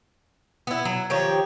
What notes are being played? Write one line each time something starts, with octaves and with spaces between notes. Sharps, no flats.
B3 E4
F#3
D#3 F3 G4 C#5